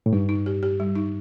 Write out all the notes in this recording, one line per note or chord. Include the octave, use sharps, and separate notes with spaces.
A2
G2 D#4
D#4
G4
G4
G3
D#4